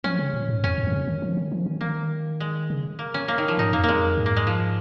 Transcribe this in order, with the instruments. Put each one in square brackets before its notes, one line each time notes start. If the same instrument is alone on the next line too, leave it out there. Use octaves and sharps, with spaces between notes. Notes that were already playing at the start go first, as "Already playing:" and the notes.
[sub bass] F3 [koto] C#4
[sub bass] C#3
A#2
G#2
[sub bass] F2 [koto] C#4
[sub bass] G#2
D#3
C#3
D#3
F3
D#3
F3
D#3
[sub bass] D#3 [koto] A#3
[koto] G#3
[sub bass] C#3
[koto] A#3
C#4
A#3
D#3
F3
[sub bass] G#2 [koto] D#4
[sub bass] F2 [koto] A#3
[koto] G#3 A#3
[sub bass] G#2
[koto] A#3
G#3
F3